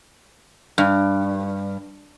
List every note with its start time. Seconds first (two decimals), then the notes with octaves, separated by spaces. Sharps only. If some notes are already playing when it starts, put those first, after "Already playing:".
0.78 G2